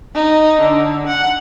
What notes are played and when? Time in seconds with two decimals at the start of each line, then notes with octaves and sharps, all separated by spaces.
0.15 D#4
0.62 D3
1.07 F#5